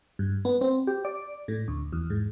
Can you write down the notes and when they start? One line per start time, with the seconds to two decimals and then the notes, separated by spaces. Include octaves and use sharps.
0.19 G2
0.45 B3
0.61 C4
0.87 G4
1.05 D5
1.48 A2
1.68 D2
1.93 E2
2.10 G#2